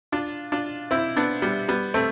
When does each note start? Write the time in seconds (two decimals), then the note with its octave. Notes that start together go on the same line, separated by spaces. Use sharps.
0.12 D4 F4
0.52 D4 F4
0.91 C4 E4
1.17 B3 D4
1.42 G3 B3
1.68 G3 B3
1.94 A3 C4